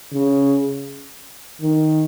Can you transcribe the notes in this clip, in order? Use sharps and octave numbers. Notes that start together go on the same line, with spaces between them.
C#3
D#3